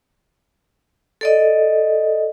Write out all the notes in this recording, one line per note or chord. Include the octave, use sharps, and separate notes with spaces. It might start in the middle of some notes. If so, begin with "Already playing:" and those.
A4 D5 D#5